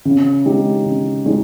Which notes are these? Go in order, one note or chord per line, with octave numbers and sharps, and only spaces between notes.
C#3
G#3 D#4 G4
C#3
G#3 D#4